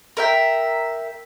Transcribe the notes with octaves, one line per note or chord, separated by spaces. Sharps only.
A#4 E5 G5